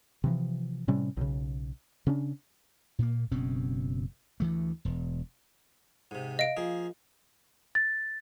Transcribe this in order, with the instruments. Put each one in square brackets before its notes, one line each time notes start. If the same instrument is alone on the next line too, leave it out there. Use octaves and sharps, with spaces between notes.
[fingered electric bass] C3 E3 F3
A2 C3 G3 C#4
B1 C#3
C#3 C#4 D4
[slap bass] A#2 A#3
F#1 B2 C4 C#4
D2 E3 A3
E1
[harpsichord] G#2 C3
[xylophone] D#5 F5 D7
[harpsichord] F3 A#3 G#4
[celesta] A6